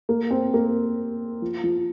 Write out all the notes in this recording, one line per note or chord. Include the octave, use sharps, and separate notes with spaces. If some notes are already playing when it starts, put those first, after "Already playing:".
A#3
C4
A#3
F3
F3